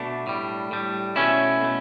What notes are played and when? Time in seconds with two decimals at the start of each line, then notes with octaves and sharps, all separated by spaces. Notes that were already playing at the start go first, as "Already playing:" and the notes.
Already playing: B2 A3 D4
0.27 A2 G3
0.71 A2 G3
1.16 B2 A3 C#4 E4
1.61 B2 A3